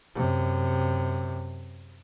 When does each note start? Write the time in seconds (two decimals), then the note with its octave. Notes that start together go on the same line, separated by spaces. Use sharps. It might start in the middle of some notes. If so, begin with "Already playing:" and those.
0.15 F#2 C3